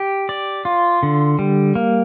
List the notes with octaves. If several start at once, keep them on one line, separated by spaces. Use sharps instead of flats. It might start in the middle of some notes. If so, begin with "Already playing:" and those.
Already playing: G4
D5
F4
D3
G3
A#3